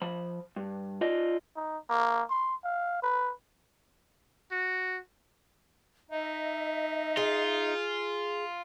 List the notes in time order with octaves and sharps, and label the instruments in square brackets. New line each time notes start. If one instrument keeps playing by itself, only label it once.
[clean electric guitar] F3 B5
G2
F4 D5 D#5
[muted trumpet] D#4
A#3
C6
F5
B4
F#4
[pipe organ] D#4 [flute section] D#5 E5
[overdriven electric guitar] F4 [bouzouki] G#4